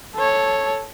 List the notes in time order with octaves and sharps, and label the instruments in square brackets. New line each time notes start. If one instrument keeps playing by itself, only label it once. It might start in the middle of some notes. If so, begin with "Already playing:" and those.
[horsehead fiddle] A4 C#5